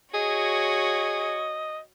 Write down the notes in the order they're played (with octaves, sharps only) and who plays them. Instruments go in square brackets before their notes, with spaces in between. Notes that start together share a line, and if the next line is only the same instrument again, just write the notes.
[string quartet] F#4 C#5 [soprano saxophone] G#4 [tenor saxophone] D#5